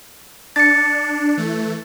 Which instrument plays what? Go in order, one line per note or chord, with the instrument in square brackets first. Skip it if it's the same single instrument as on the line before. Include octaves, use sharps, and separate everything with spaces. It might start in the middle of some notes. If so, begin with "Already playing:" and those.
[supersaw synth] D4 [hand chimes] A6 C#7
[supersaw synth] E3 A3